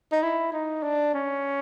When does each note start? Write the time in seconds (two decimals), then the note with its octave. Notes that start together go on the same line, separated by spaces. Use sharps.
0.12 D#4
0.23 E4
0.53 D#4
0.83 D4
1.14 C#4